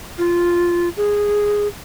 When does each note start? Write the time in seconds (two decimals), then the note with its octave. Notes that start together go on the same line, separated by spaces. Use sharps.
0.18 F4
0.97 G#4